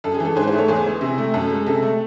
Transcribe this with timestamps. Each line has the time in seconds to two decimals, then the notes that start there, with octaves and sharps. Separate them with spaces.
0.04 F#2 A4
0.14 G#4
0.20 E3 A4
0.36 G#2 G#4 C5
0.47 G#4 C5
0.52 A3
0.58 A4 C#5
0.68 E2 G#4 C5
0.86 E3
1.01 C3
1.18 A3
1.34 F#2 A4
1.50 G#3
1.66 C3 A4
1.82 A3